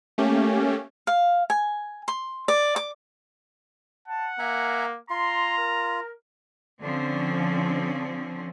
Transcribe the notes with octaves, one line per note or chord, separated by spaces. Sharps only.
A3 A#3 C#4 G4
F5
G#5
C6
D5
D6
F#5 A5
A#3 E5 G#5 A#5
F4 A#5 C6
A#4
D3 F3 C4 C#4